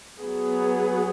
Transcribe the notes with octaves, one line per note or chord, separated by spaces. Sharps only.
F#3 B3 G#4